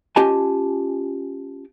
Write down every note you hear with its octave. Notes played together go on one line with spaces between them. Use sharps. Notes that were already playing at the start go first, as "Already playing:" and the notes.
C#4 F4 G4 D#5 G#5 A5